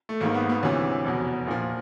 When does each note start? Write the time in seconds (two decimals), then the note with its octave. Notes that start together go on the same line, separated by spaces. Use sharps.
0.09 A3
0.21 G#1 G#2 D#3 A#3
0.34 B3
0.49 B3
0.63 D2 C3 E3 C#4
1.05 F1 E2 B2
1.47 A#1 A#2 F3